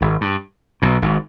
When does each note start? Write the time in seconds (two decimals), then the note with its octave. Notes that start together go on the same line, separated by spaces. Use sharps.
0.01 G#1 G#2
0.21 G2
0.82 B1 B2
1.02 G#1 G#2